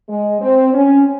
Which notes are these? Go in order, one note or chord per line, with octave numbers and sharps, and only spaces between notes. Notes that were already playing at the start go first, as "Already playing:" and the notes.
G#3
C4
C#4